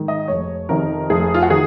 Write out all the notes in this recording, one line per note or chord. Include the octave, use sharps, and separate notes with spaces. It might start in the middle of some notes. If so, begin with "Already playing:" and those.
Already playing: G#2 D#3
D#5
F1 C#5
F2 C3 D#3 A#4
F1 G#4
F4
F#4
D#3 G#4